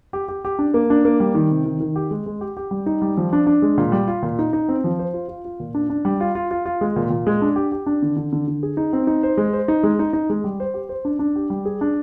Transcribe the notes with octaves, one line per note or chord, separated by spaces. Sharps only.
G4
G4
G4
D4
A#3
D4
A#3
G3
D#3
C3
D#3
D#3
G4
G#3
G#3
G4
G4
G3
D#4
G3
F3
D4
D4
G#3
A#2
G3
F4
A#2
D#4
D#4
C4
F3
C5
F4
F4
F4
A#2
D4
D4
G3
F4
F4
F4
F4
G#3
A#2
A#2
G#3
D4
G4
G4
D4
D3
D3
D3
D3
G#4
D#4
C4
D#4
C5
G#3
C5
D#4
G#3
D#4
D#4
G#3
G3
C5
G4
C5
D4
D4
G4
G3
G#4
D4